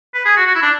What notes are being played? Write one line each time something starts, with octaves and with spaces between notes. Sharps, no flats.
B4
G#4
F#4
F#4
E4
D4